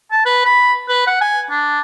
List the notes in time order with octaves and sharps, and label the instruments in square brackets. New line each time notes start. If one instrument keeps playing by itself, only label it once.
[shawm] A5
B4
B5
B4
F#5
G#5
D4